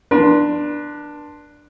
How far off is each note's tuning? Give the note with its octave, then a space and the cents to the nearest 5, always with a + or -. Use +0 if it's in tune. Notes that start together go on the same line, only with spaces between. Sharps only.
D4 +10 B4 -45 C6 +0